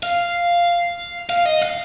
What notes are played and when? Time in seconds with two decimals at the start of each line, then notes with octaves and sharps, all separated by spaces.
0.03 F5
1.30 F5
1.46 D#5
1.62 F5